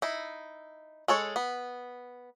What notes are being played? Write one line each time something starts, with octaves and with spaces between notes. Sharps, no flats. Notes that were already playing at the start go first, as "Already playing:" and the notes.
D#4 E4
G#3 A4 C#5
B3